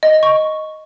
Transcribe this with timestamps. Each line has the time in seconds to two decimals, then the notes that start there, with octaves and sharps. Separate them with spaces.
0.03 D#5
0.23 C#6